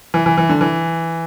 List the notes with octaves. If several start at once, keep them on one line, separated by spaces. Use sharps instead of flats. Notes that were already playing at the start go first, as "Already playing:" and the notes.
E3
E3
E3
D3
E3